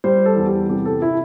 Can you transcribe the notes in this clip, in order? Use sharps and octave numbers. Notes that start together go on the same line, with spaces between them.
G3 C5
A4
E2
G4
C3 G4
A4
E4